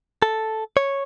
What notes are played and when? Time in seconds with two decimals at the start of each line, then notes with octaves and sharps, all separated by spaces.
0.22 A4
0.77 C#5